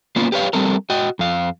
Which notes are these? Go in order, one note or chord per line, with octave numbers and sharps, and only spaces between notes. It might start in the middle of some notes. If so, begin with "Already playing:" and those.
A#3 B3 C#4 F4
G4 B4 C#5 F5
G3 C4 A4 A#4
F#4 D#5 G5
F2 F5